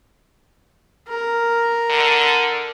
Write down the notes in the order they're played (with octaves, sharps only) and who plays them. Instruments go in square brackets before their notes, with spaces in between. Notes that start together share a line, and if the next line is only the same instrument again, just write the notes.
[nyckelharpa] A#4
[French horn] D3